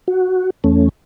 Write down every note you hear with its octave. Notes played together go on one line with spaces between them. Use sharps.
F#4
E2 A3 C#4